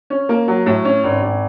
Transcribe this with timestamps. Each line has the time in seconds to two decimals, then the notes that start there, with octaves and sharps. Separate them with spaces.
0.10 C#4
0.29 A#3
0.48 F#3
0.66 A2
0.85 C#4
1.04 G#1
1.22 G#1